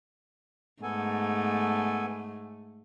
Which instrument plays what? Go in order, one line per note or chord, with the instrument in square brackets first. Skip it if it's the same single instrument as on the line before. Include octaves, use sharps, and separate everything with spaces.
[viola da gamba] G#2 A3 [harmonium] B3 A4 G#5